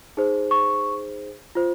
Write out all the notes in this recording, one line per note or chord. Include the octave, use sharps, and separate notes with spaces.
D#4 G#4 C5
C#6
F4 C5